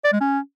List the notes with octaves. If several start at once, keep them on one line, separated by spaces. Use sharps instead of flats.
D5
G#3
C#4